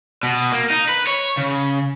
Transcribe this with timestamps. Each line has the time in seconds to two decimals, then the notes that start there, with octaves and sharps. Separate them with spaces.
0.23 B2
0.52 A#3
0.70 D#4
0.89 B4
1.07 C#5
1.37 C#3